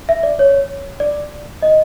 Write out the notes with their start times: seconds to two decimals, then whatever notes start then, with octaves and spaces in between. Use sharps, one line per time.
0.09 E5
0.23 D5
0.39 C#5
1.00 D5
1.62 D#5